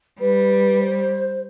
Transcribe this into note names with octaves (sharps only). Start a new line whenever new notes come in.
G3 B4
C5